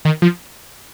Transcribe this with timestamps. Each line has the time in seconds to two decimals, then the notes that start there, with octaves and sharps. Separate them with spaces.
0.05 D#3
0.22 F3